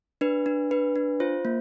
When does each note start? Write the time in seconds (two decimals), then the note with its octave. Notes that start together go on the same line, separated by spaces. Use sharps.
0.21 D4 B4
0.46 D4
0.71 D4 B4
0.96 D4
1.20 F4 C5
1.45 A#3